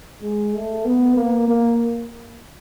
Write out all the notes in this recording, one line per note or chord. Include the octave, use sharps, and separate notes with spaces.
G#3
A3
B3
A#3
A#3